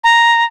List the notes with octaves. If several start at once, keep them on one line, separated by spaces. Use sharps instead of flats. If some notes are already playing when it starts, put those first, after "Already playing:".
A#5